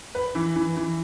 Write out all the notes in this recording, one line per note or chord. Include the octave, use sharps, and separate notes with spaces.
B4
E3
E3
E3